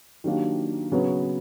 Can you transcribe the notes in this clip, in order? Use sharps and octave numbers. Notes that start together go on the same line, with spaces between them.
D#3 F#3 A#3 D4 G4
C#3 F#3 B3